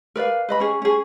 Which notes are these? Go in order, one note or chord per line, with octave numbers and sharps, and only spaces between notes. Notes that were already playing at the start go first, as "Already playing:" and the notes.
A#4 B4 D5 F5
B4 D#5 B5
C#4 G#4
C#4 G#4